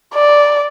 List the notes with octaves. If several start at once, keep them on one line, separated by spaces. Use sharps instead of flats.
D5